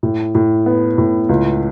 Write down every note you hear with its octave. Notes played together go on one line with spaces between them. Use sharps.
A2
A2
B3
A2
C#2